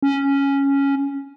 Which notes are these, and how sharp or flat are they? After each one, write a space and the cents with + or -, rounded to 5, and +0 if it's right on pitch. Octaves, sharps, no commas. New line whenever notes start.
C#4 +0